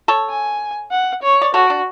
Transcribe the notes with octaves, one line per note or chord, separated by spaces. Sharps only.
A4 C#5
G#5
F#5
C#5
D5
F#4 A4 C#5
D4